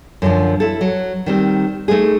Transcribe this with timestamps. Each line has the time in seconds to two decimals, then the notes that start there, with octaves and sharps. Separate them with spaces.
0.22 F#2 D3 E3 F3
0.60 E4 A4
0.81 F#3
1.26 D#3 G3 C4
1.88 A3 D#4 G#4